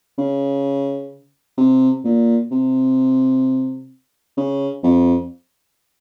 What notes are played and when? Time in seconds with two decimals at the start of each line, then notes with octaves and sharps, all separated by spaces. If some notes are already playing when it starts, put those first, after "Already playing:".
0.18 C#3
1.58 C3
2.04 A#2
2.51 C3
4.37 C#3
4.83 F2